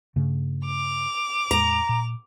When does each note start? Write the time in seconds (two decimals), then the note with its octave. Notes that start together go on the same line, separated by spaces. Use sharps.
0.16 G2 C#3 A3
0.66 D6 F7
1.51 E2 A2 G#3 A#5
1.89 A#2